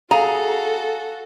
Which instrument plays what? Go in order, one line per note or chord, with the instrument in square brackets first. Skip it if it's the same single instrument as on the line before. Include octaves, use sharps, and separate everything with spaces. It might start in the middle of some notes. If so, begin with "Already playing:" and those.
[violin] F#4 A4 [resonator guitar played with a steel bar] G#4 [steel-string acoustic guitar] F5 [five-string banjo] A#5